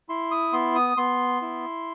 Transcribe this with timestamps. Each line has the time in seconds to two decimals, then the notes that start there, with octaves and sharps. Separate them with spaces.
0.09 E4 C6
0.31 D#6
0.53 B3 C6
0.75 D#6
0.97 B3 C6
1.42 E4